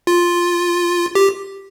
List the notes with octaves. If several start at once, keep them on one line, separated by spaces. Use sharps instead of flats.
F4
G4